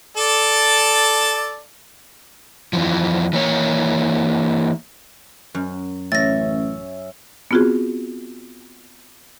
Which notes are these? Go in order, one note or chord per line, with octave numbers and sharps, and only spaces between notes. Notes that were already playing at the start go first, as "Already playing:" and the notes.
A4 D5 A5
F2 E3 F3
E3 A#3 C#5
F#2
A1 C#4 E5 A6 A#6
B3 C4 F4 F#4 G#4